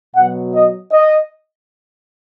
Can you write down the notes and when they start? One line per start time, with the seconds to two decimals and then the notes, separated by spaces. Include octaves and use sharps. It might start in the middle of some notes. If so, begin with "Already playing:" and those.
0.15 B2 F#3 F#5
0.54 D#5
0.92 D#5